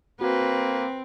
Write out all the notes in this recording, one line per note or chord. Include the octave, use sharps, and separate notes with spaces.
A#3 C4 F#4 B4